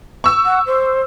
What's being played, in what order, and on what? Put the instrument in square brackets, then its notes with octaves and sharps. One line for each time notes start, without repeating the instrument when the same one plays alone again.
[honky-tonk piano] C#6 E6
[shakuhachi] F#5
C5